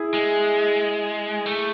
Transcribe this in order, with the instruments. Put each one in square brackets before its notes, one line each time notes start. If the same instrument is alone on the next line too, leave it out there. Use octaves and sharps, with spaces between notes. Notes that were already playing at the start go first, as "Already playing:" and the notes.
Already playing: [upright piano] E4 G#4
[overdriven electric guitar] G#3
A3